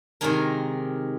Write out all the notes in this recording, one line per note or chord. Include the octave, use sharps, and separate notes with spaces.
C3 D#3 G#3 A#4